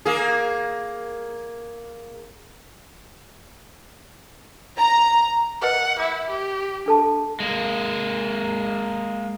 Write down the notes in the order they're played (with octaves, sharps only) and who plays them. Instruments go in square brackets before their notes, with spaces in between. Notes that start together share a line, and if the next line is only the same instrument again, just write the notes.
[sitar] A#3 G#4
[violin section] A#5
[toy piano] A#4 B4 D#5 [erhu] F#5
[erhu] E4 [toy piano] D6
[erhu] G4
[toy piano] D4 A4 A5
[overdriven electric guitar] G#3 A#3